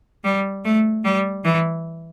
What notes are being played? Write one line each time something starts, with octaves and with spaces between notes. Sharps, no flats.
G3
A3
G3
E3